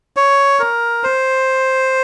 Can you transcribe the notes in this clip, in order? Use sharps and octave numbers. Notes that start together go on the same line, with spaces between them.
C#5
A#4
C5